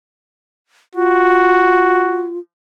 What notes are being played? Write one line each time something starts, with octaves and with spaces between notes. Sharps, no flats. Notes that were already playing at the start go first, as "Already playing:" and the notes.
F4 F#4